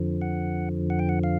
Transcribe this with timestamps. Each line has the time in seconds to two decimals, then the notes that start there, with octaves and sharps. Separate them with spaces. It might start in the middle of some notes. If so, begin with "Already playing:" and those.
Already playing: F2 D3 F3
0.22 F#5
0.90 F#5
0.99 G5
1.09 F#5
1.24 F5